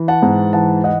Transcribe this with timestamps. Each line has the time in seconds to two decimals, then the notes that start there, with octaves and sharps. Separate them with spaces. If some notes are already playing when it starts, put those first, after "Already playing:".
Already playing: E3
0.08 F#5 A5
0.23 G#2
0.53 E3 F#5 A5
0.84 E3 D#5 F#5